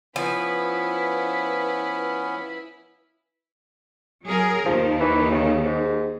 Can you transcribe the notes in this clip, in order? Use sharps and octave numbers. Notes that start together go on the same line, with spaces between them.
F3 B3 C#4 E4 B4
F#3 G#4 A#4
D#2 D#3 F3
E3
C#3
G#2